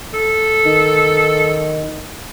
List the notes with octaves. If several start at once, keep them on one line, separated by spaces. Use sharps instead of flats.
A4
D#3